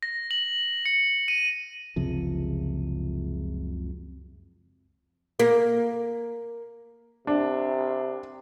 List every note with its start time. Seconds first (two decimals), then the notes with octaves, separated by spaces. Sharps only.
0.03 A#6
0.31 F#7
0.86 C#7
1.28 D#7
1.96 F#1 C#2 C3 F3
5.40 A#3
7.27 C3 D4